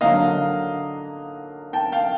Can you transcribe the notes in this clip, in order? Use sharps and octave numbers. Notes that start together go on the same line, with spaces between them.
D3 F#3 A#3 D#5 F5
G5 A5
F5 G5